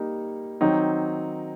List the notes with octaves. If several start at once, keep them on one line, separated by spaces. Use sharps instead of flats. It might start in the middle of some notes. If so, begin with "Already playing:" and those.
Already playing: G3 A#3 D#4
D#3 F#3 C4 D#4